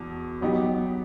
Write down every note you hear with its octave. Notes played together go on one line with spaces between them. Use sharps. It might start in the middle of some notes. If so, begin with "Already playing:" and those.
Already playing: E2 B2
F#3 B3 D#4 G4